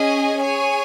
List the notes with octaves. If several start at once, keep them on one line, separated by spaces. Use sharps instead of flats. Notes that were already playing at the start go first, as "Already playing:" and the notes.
Already playing: C#4 G#4 D#5 G#5
G#4 C#5 G#5